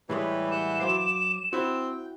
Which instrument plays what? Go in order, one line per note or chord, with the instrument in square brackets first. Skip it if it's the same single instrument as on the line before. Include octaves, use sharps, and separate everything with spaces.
[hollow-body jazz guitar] A2 G3 G#3 [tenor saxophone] E3 [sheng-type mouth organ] G4 B4 C#5
[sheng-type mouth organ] F#5 F#6 G6 [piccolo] E7
[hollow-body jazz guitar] F#3 C5 F5 [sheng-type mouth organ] D6
[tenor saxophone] C4 [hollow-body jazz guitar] E4 F#4 [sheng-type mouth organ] G5